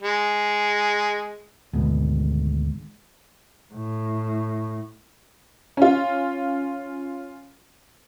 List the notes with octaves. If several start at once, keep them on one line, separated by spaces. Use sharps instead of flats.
G#3
G#1 D2 G#2 B2
A2
C#4 F4